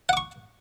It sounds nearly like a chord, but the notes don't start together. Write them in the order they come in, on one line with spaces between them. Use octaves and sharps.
F#5 D6 C#6